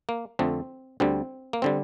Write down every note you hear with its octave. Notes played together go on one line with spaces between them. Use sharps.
A#3
F2 D3 A3 C4
D2 D3 G3 C4
A#3
D3 G3 C4